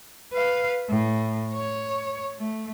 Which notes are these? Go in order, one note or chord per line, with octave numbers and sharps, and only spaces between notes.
B4 F5
A2
C#5
A3